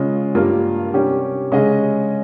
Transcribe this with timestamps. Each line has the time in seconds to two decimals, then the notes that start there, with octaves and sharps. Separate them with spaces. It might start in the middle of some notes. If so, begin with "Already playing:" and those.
Already playing: C#3 G#3 C#4 F4
0.35 G2 G3 A#3 F4 A#4
0.94 C3 G3 C#4 G4
1.52 C#3 G#3 C#4 G#4 D#5